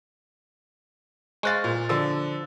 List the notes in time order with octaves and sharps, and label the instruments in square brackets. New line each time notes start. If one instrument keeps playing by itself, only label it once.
[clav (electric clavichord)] G#3 C5 F5 [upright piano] C#6 F#6 A6
[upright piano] A#2
[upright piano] D3 E6 [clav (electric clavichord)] F3